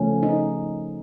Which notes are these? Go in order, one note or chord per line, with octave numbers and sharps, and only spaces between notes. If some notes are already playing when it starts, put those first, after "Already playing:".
Already playing: C#3 F3 A3 C#4
D#4